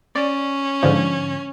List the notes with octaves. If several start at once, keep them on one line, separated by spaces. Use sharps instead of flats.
C#4 D5
G#2 D3 F3